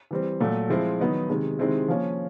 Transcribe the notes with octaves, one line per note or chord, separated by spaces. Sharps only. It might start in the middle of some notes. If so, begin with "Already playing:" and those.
E3 G3 C4
A#2 F#3 A3
F3 G#3 C4 E4
D#3 F#3 B3 D#4
C3 D#3 G#3
C3 D#3 G#3 C4 E4
F3 A#3 C#4